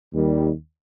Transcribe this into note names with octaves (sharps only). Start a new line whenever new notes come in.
D#2 D#3 G3